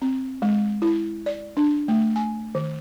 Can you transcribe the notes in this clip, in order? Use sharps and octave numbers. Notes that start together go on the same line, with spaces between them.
C4
G#3
E4
D5
D4
A3
G#5
D#3